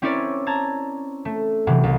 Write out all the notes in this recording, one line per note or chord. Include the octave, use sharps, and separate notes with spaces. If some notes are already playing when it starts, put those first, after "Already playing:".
C4 C#4 E4 A#4 C#5 D5
A5 A#5 G#6
A3
C3 E3 F#3 G#3
C2